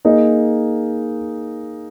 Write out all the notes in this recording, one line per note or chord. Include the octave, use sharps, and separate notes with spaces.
A#3 D#4 G#4 D#5